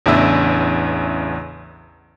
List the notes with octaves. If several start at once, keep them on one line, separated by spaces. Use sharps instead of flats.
A1 E2 C#3 D4 E5 E6